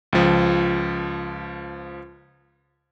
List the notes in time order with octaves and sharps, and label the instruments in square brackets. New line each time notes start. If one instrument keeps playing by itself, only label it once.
[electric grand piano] C#2 F3